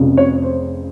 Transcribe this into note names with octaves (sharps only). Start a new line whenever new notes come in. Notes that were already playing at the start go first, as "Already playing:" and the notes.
Already playing: F1 F2 C#3
C#5
C5